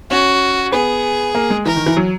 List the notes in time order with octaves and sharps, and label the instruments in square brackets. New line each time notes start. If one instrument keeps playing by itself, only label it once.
[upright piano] C#4 [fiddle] F#4
[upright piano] B3 [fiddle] G#4
[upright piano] A#3
G#3
[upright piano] E3 [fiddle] A#4
[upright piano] D#3
E3
F#3